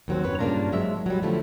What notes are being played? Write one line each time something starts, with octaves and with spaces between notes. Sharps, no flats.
D#2 F#3 C4
F#2 B4 C#5
G2 C#3 A#3 D4 F4 A#5
G#2 F#3 G#3 E5
F#3 G3
D3 F3 A3 E4